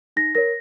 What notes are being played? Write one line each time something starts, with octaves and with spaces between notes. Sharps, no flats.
D#4 A#6
A#4 C#5 A#6